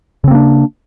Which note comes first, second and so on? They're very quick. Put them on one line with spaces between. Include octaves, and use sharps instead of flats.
C#3 C4 A#3 D4